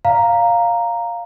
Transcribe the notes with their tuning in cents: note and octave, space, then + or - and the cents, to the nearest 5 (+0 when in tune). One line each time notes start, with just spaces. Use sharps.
D5 +0 F5 +0 A#5 +0